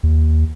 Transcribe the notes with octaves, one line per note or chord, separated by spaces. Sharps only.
D#2